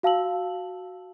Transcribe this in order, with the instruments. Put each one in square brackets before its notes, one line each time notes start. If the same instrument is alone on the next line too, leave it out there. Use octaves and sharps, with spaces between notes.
[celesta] F#4 F5 A5 E6 F#7